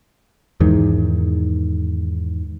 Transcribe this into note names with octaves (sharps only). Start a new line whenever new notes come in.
E2 G#2 D#3